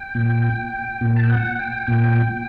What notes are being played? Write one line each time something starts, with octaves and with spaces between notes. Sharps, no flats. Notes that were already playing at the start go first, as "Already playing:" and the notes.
Already playing: G5
A#2
A#2
A5
G5
F#5
G5
A#2 G5